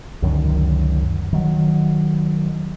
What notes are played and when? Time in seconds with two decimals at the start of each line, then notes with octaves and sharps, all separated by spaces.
0.22 C#2 F#2 D3 D#3
1.33 D#3 F#3